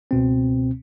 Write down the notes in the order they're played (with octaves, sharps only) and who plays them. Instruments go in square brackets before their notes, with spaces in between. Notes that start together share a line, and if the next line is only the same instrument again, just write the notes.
[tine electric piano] C#2 B2 C4